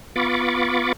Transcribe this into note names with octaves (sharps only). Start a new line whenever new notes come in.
B3 F4 B5 C#6 D6 A6